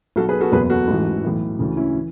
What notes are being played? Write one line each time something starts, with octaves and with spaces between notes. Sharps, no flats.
B1 B2 F#4 A4
G#4 B4
F#4 A4
F#1 E2 B2 G#4 B4
F#4 A4
A1 G#2 E3
B1 A2 E3
D2 C#3 E3
C#4 E4
E3